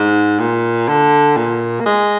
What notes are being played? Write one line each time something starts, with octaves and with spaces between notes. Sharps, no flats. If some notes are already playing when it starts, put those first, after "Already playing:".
Already playing: G#2
A#2
D3
A#2
A#3
G#3